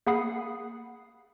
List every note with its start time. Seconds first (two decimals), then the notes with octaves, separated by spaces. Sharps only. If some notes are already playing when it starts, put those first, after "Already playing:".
0.07 A#3 G#4 F#5 B5 D#6 C7